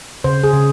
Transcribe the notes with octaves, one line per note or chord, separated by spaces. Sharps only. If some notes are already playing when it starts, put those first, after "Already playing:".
C#3 C5
G#4
C#3